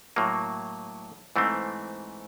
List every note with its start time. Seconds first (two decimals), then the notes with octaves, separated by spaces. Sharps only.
0.16 A2 F#3 A#3
1.36 G#2 E3 A3 C4